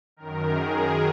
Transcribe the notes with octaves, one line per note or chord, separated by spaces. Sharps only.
F#2 D#3 A#4
G#4